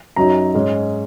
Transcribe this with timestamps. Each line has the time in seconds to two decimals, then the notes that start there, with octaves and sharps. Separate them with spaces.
0.16 F#2 F#3 D#4 A#5
0.55 G#2 G#3 C#4